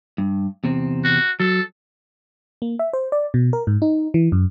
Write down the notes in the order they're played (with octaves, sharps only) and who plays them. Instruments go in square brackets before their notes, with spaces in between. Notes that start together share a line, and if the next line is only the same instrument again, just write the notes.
[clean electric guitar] G2
E2 C3 C4
[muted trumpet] F#4
[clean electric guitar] F#3 [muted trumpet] A4
[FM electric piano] A#3
E5
C5
D5
B2
A#4
G#2
D#4
E3
F#2